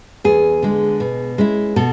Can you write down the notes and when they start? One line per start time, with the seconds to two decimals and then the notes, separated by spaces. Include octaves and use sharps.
0.24 E2 G#4
0.62 D3 G#3
1.00 B2
1.38 G#3 C#4 E4
1.76 B2 A4